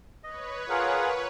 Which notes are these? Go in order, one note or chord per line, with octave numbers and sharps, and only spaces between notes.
B4 C#5 D#5
F4 G#4 A#4 F#5